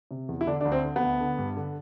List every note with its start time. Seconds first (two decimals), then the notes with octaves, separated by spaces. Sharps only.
0.11 C3
0.29 E2
0.41 E4
0.47 D3 D4
0.61 D2 D4
0.72 C4
0.84 D3
0.96 B3
1.02 D2
1.21 D3
1.38 G2
1.57 D3